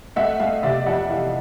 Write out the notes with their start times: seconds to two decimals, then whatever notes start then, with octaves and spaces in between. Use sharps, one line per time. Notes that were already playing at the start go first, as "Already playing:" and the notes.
0.16 A3 E5 F#5
0.40 A3 D#5 F5
0.63 C3 D5 E5
0.86 F2 E5 F#5
1.10 E3 D#5 F5